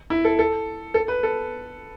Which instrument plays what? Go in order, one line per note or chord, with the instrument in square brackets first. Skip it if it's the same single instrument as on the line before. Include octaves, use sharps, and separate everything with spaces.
[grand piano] E4
A4
A4
A4
B4
A4